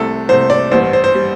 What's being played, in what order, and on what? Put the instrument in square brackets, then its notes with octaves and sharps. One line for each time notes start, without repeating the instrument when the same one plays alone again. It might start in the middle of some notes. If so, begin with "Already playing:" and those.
Already playing: [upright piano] C2 C3 A3 A4
C2 C3 A3 C5
D5
A1 G2 G3 C5
C5
C5
G3